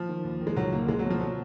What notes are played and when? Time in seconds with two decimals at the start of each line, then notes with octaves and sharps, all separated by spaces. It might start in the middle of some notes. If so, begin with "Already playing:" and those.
Already playing: F3
0.09 D#3
0.24 D#2
0.41 D#3
0.47 G#3
0.57 C#2 F#3
0.72 C#3 A#3
0.88 C#2 G#3
0.99 F#3
1.05 B2
1.10 F3
1.20 F#3